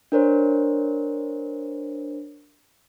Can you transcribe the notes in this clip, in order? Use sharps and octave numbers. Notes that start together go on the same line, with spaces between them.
D4 A#4 C5 C#5